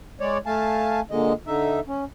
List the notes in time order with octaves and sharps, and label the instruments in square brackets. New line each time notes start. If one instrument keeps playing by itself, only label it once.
[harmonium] G#3 C#5 D5
A3 F5 G#5 A5
A#2 D3 G#3 D#5
D3 D#4 E5
C#4